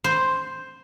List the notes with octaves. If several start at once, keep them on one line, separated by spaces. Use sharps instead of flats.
C5